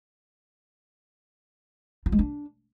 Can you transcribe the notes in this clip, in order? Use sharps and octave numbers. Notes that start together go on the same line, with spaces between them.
F4
G#3
D4